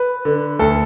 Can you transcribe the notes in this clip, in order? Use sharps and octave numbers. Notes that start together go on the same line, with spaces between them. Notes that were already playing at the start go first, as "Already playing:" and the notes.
Already playing: B4
D3
D2 A4